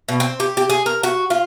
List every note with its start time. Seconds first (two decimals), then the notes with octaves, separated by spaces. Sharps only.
0.09 B2
0.20 C4
0.40 G4
0.57 G4
0.70 G#4
0.86 A#4
1.03 F#4
1.30 F4